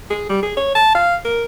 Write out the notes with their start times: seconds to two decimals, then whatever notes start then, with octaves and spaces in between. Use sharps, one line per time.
0.10 G#4
0.29 G3
0.43 G#4
0.57 C#5
0.75 A5
0.95 F5
1.25 A#4